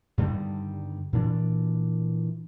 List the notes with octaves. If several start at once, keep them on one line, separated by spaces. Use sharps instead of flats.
G2 D3 D#3 G3
A#2 E3 D4